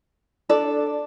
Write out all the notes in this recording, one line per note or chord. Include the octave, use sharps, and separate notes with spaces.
D4 A4 D5